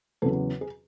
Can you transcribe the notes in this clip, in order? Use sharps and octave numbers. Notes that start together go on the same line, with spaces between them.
E2 C#3 F#3 A4
G#4